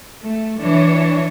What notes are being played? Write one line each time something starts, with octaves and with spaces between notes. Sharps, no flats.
A3
E3 D4 C#5